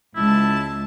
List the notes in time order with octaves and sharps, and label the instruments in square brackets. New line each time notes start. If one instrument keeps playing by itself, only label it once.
[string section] C#2 A5 [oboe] E4